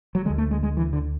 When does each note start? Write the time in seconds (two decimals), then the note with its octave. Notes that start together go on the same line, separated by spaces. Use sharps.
0.15 F#3
0.25 D3 G#3
0.30 D2
0.38 A3
0.51 G#3
0.63 G#3
0.77 E3
0.93 D3